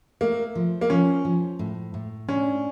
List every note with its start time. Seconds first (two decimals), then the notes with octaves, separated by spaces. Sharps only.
0.21 A3 A#3
0.55 F3
0.81 A#3
0.90 F3 C#4
1.25 F3
1.59 A2
1.94 A2
2.28 C#4 D4